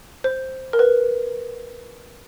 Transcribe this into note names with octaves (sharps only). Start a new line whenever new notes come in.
C5
A#4
B4